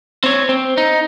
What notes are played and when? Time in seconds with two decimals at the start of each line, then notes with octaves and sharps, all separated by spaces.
0.24 C4 C#5
0.49 C4
0.78 D#4